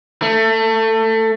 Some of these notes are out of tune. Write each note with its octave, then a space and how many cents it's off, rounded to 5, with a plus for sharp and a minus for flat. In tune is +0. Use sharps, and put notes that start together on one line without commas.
A3 +20